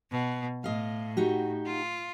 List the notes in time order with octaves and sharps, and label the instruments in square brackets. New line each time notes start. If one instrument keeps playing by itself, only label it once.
[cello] B2
[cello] A2 [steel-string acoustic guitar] D#5 F5
[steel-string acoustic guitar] D#4 F#4 G4
[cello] F4